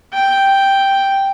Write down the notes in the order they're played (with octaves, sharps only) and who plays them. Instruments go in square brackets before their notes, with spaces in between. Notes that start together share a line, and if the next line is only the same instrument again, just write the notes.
[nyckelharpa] G5